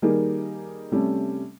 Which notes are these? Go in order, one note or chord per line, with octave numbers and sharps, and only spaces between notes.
D#3 G3 A#3 D#4 G#4 A#4
C3 G3 A3 C#4